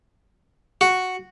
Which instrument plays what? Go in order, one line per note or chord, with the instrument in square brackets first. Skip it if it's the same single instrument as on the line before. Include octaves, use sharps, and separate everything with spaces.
[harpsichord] F#4